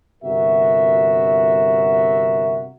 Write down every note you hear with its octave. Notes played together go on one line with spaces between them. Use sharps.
G1 C3 F#4 A#4 E5